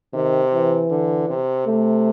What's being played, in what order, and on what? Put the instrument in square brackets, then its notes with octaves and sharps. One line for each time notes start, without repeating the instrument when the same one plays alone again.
[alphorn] C3 [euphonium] D#3
[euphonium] E3
[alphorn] D3
C3
[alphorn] C3 [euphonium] A3